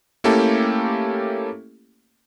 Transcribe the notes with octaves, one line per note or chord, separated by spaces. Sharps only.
A3 A#3 C#4 E4 G4 A4